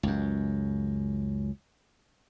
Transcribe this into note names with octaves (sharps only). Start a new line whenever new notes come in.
C#2 F#2